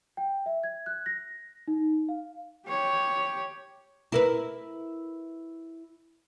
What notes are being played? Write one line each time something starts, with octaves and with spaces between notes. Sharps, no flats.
G5
E5
G#6
F#6
A#6
D#4
F5
G4 C#5
E4 A#4 B4